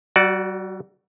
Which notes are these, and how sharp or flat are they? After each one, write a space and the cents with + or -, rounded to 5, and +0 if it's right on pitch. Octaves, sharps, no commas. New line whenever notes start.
G3 -45 F#4 +0 D5 +0